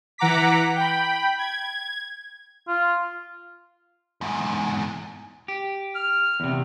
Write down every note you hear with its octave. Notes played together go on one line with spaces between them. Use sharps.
E3 F#5 A#5 D6 B6
G5 B5
G#6
F4
E2 G#2
G4
F6
E2 C3